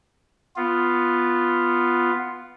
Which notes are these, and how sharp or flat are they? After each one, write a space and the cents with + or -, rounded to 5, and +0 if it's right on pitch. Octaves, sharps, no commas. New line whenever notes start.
B3 +0 F4 +0